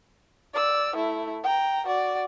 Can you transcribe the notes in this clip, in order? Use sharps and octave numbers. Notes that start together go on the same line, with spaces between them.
D5 E6
A3 E4
G5 A#5
F#4 D5